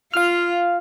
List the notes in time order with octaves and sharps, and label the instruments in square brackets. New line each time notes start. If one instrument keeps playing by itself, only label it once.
[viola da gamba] F4 [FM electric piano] F5 F6